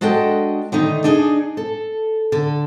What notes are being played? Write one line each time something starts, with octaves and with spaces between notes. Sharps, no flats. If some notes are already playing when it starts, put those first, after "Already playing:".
G#3 D4 F#4 A4 D#5 G5
D3 D#3 A3 D#4
D4 D#4 G#4 D#5
A4
D3 A4